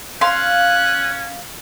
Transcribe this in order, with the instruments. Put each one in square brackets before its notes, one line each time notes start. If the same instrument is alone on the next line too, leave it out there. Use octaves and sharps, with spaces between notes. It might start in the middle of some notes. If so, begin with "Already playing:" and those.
[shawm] C#4 [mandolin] F5 C6 [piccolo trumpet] F#6